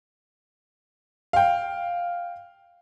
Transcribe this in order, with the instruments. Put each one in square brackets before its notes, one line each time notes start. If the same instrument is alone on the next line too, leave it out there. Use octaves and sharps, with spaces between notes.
[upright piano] F5 G5